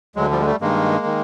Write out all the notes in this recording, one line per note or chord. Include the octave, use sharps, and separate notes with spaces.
D2 D3 F#3 G#3
F3 G3
G#3
G3 A3
G2 D#3 G#3 A#3
D#3